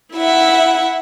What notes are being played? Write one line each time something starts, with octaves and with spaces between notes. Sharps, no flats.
E4 E5 F#5